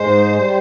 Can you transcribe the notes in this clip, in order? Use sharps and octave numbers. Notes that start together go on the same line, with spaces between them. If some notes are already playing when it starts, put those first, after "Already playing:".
Already playing: G#2 G#3 C5
G3